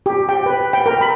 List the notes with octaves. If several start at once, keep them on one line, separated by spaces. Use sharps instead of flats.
G4
G5
B4
G5
A#4
B5